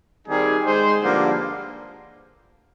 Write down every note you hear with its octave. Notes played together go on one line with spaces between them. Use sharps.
D#3 G3 C4 D#4 G#4
G#3 D#4 G#4 C5
G2 D3 F3 A#3